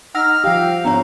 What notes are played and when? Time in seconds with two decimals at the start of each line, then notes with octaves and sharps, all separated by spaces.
0.15 D#4 F#5 E6 F6 A#6
0.44 F3 G4 F5 G5
0.85 E2 G#2 B3 D4 C#5 A#5